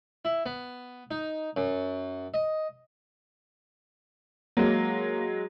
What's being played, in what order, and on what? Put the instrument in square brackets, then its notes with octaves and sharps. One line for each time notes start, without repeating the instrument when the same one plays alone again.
[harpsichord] E4
B3
D#4
F#2
D#5
[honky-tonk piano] F#3 G#3 [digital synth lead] A#3